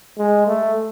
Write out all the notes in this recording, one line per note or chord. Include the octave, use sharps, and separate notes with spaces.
G#3
A3